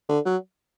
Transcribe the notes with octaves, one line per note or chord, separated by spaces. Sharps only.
D3
F#3